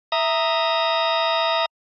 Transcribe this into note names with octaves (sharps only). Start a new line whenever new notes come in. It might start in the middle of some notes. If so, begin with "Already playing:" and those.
E5 A#5 D#6